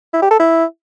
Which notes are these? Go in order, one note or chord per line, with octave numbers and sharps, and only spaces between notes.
E4
G4
A4
E4